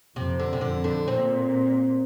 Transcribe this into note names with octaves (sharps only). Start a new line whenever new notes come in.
F2 C3
D3
C3
F2 D3
D3
A#2 C4